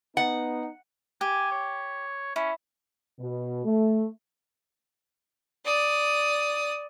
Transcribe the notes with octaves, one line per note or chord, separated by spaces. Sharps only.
B3 D#4 F#5
G4 G#5
C#5
C#4 E4
B2
A3
D5 D#6